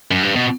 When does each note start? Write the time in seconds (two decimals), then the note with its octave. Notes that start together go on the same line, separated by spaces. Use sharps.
0.11 F#2
0.23 G2
0.36 B2